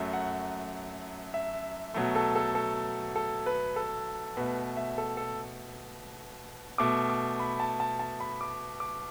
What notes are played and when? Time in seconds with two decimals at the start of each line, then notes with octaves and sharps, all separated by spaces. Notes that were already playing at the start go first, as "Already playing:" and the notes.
Already playing: F#2 F#3 A3
0.13 F#5
1.34 E5
1.94 B2 F#3 A3
2.15 A4
2.35 A4
2.55 A4
3.16 A4
3.46 B4
3.76 A4
4.37 B2 A3 B4
4.77 E5
4.98 A4
5.17 A4
6.78 B2 A3 D6
7.10 D6
7.39 B5
7.60 A5
7.80 A5
7.99 A5
8.20 B5
8.41 D6
8.80 D6